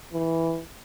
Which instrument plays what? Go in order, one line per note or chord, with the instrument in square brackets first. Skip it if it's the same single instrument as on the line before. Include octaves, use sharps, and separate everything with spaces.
[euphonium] E3